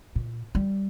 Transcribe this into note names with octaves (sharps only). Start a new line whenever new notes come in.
A#2
G3